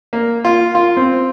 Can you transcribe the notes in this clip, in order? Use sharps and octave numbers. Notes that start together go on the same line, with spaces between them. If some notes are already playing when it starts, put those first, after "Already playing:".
A#3
F4
F4
C4